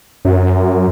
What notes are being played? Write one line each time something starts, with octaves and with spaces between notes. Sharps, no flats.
F#2